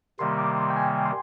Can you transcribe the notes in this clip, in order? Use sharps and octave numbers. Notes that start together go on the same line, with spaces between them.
C3 D#3 G3 A#3 C6
D6
C6
G5
G#5
C6